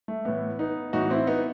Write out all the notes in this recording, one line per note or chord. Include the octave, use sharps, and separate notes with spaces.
A3
A2 E3 B3
B3 D#4
A2 E3 D#4 F#4
C4 E4
B3 D#4